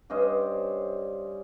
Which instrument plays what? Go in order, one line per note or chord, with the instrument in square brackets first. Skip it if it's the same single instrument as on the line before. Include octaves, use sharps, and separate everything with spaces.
[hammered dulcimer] G2 C#4 C5 D#5